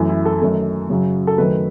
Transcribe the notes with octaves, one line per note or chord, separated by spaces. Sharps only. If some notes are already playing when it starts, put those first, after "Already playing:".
Already playing: F#2 E3 A3
E4
A4
F#2 D#3 A3
F#2 C#3 F#3
A4
F#2 D#3 A3 B4